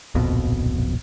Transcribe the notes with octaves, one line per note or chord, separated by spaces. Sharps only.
D1 A#1 F2 B2